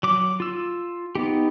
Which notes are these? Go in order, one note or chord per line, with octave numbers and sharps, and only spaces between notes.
F#3 D6
F4 E6
B3 D#4 G4